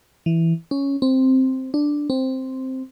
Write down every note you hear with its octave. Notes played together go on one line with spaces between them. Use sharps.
E3
C#4
C4
D4
C4